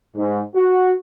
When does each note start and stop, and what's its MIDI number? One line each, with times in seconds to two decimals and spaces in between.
0.16 0.40 44
0.55 0.91 66